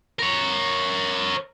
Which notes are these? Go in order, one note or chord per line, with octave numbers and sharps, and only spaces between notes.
A#4 C#5